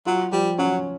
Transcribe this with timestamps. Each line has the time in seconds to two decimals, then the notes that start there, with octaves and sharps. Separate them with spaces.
0.06 F#3 F4
0.32 F3 G3
0.58 F#3 C#4